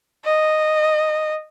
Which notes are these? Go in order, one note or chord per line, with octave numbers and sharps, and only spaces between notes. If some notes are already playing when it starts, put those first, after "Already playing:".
D#5